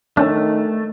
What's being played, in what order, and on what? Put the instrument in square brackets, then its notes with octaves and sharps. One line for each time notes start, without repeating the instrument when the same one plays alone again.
[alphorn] D#3 [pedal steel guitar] A3 [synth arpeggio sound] C#4 D4